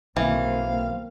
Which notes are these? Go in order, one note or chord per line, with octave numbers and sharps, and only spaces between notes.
B1 D#3 E3 A#3 C4 F5